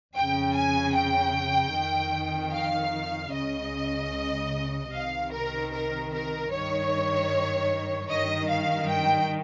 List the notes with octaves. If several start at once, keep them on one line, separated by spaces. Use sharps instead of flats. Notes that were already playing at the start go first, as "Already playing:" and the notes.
F2 C#3 G5
G#5
G5
F2 D#3
F5
C#2 C#3 D#5
C2 C3 D#3 F5
A#4
A#4
A#4
G2 D#3 C#5
G2 D#3 D#5
F5
G5